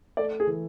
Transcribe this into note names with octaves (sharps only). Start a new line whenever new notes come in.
A3 D5
G#4
E3